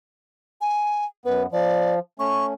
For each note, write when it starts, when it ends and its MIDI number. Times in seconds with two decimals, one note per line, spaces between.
0.61 1.05 80
1.25 1.46 42
1.25 1.46 59
1.25 1.43 71
1.52 1.99 53
1.52 1.94 74
2.19 2.54 57
2.19 2.54 61
2.19 2.45 85